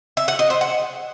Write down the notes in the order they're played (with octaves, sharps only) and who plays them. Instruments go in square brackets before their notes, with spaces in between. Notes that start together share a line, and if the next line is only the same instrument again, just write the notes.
[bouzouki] E5
F#5
D#5
C5
F#5